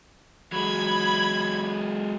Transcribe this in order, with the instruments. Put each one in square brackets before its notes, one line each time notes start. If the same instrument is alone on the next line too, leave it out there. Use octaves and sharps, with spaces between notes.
[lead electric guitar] F#3 G#3 [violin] B5 G#6